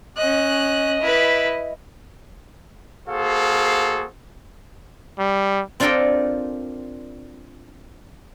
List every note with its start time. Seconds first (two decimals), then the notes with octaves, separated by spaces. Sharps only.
0.17 C#4 D#5 F#6
1.01 E4 B4
3.08 A#3 F#4 G#4 A4 C5 F5
5.18 G3
5.80 C4 D4 F4 A4 A#4 G5